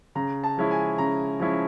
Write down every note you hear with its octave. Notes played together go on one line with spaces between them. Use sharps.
C#3 A#5
A5
F3 G#3 C#4 E4
G#5
C#3 A#5
F3 G#3 C#4 E4